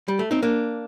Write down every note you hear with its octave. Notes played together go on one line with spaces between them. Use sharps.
G3
A3
C4 D#4
A#3 D4